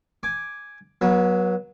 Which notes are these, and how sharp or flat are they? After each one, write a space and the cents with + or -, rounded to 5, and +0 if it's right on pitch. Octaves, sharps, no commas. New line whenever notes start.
G#5 +0 D6 +0
F#3 +0 B3 -35